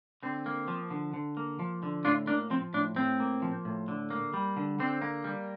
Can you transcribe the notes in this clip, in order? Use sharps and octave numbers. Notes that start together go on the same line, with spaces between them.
D3 C4
A#3
F3
D3
D3
A#3
F3
D3
A2 D4 F4
A#3 D4
F3 C4
A2 D4
A2 C4
A#3
F3
A2
D3
A#3
G3
D3
D3 C4
A#3
G3